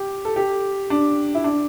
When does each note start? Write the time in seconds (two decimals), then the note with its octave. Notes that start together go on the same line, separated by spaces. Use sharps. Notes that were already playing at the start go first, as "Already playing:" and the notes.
Already playing: G4
0.25 A4
0.36 G4
0.90 D4
1.35 E4
1.44 D4